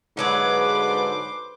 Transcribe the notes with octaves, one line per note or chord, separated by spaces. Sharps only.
G#2 D3 F#3 G#4 B4 C5 D6